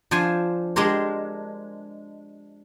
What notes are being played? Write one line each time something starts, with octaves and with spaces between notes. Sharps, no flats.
F3 D4 C5 G#5
G#3 D4 G4 A#4 C5